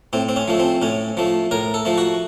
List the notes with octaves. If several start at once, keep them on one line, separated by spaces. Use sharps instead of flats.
A2 C4
C4
C#4
F3 A3
C4
A2 C#4
F3 A3
A2 A#4
A4
F3 A3
F#4